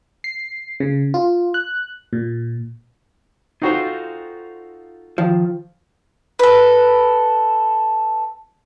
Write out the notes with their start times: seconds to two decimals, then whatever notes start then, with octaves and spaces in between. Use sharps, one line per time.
0.24 C7
0.80 C#3
1.14 F4
1.54 F#6
2.13 A#2
3.62 D#4 F4 F#4 A4 C5 F5
5.18 D#3 F3
6.39 A4 B4